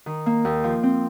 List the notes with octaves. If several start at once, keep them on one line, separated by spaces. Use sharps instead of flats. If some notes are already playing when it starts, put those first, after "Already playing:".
D#3
A#3
D#2
F3
C4